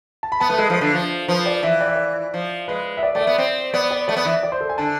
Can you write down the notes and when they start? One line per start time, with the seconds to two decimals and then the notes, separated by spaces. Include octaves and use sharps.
0.23 A5
0.32 B5
0.40 B3 A5
0.50 A3 B4
0.58 G#3 A4
0.70 F3
0.81 D3
0.94 F3
1.28 F3 B4
1.46 D5
1.63 E3 E5
1.81 D5
1.88 E5
1.96 D5
2.34 F3
2.68 G#3 B4
2.97 E5
3.03 D5
3.15 A3 D5
3.21 E5
3.27 B3
3.38 C4
3.74 B3 D5
3.91 D5
4.08 A3 D5
4.16 B3
4.25 E3 E5
4.43 D5
4.52 C5
4.61 A4
4.69 G#5
4.78 D3 A5